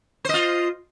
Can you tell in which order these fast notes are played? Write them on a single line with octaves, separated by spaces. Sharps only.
C5 D#5 F4